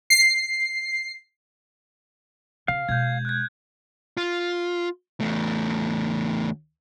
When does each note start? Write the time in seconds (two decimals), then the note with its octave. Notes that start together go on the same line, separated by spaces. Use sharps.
0.10 C7
2.68 C#3 F5
2.89 B2 G#3 G6 G#6
3.25 F#6 G#6
4.17 F4
5.21 E2 A3